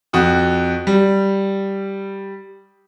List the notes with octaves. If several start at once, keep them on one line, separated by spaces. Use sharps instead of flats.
F2 F#4 D#6
G3